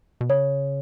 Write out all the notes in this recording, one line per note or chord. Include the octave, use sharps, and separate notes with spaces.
B2
C#3 C#5